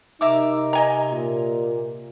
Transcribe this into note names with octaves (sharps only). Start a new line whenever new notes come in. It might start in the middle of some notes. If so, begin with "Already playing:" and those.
C3 D#4 A#4 E5 D6
D#5 G#5 A#5
A#2